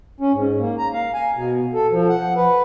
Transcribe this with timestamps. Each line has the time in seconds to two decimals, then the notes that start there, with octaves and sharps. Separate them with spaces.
0.20 C#4
0.33 G#2
0.59 A#3
0.78 A#5
0.93 F5
1.14 G#5
1.36 B2
1.74 A4
1.92 F3
2.09 F#5
2.36 B4